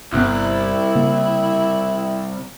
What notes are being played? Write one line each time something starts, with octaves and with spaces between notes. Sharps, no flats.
G1 C2 C3 B3 E4
C#3 A#3